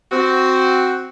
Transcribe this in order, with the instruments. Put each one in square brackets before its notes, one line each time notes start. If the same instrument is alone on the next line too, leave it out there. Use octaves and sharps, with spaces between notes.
[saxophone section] C4 F#4